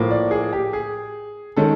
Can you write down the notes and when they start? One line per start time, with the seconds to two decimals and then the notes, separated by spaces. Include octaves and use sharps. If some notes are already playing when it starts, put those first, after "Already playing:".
Already playing: A2 F3 A#3
0.11 D5
0.31 G#4
0.53 G4
0.73 G#4
1.57 D#3 G#3 C#4 A4